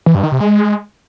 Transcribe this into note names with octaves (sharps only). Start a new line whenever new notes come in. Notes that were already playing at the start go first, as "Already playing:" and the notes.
E3
G2
D#3
C3
G#3